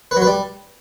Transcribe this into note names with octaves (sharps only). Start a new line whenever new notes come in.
B4
F#3
B4
G3